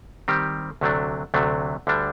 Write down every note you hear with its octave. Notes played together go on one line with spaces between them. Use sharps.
D#3 G3 C4 G4
D2 C3 F#3 A3 D4
D2 C3 F#3 A3 D4
D2 D3 G3 D4